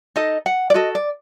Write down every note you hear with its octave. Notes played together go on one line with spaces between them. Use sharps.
D#4 A4 D#5
F#5
D5
F#4 A4 D#5
D5